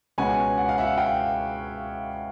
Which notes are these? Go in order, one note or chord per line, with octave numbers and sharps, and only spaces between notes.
C#2 B2 G#3 C#4 F#5 G#5
F#5
F5
E5 F#5
F5 G5